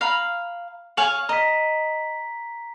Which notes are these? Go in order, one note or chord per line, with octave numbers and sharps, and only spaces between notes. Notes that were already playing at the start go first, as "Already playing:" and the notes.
F5 A#5 B5
C#5 F5 G#5 F#7
D#5 A#5 B6